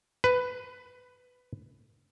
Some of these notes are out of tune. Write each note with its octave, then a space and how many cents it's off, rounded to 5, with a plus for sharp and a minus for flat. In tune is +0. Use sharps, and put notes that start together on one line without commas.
B4 +10